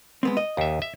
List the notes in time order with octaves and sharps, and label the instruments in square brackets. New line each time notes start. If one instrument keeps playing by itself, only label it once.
[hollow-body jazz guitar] G#3 B3 C4
D#5
[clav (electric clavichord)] D#2 E5
E5